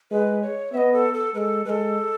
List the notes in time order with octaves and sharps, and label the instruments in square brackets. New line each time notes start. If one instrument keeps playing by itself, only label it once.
[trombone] G#3 [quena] B4
[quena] C#5
[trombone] B3 [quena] D#5 E5
[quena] A4
A4
[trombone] G#3 [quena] A4 B4
[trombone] G#3 [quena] A4 B4